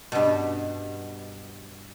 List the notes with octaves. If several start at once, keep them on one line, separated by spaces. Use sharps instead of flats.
G2 B2